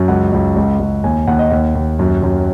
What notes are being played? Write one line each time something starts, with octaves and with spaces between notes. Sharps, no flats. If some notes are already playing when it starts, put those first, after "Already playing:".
Already playing: F#2
C#2 F#5
C#2
C#2
C#2
D#2 G#5
D#2 F#5
D#5
D#2 F#5
D#2
F#2
F#2